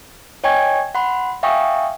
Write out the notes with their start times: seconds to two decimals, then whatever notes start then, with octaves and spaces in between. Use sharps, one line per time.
0.44 C#5 D#5 G5 G#5 C#6 G#6
0.95 F#5 B5 C6
1.43 E5 F5 G5 G#5 C#6 D#6